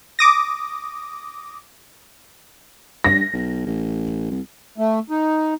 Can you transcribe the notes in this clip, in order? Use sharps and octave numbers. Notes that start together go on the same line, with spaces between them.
D6 D#6 A#6
G2 A#6
B1
A1
C2
A3
D#4